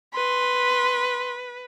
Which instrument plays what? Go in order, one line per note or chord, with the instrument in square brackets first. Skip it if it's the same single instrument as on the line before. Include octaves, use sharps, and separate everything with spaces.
[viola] B4 [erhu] C6